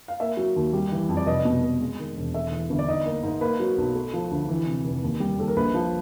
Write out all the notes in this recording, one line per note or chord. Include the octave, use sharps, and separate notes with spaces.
F5
A#3 E5
F#3
D#2
G3
E3
F2
D5
F1 D#5
B2
F1
G#3
D#3
E1
A3 E5
E3
G1
D5
D#4 D#5
A#3
G#2
A#3 B4
F#3
B1
A3
F3
D2
E3
C3
F1
D#2
G3
D#2 A4
A#4
A#1 B4
F3